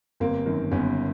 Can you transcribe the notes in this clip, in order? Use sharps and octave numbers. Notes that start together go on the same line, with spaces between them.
G1 A#3 C4
F#2 D#3
G1 B3 C#4